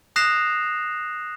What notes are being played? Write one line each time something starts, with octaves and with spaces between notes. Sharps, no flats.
D#6 F#6 A#6 C7 E7 F7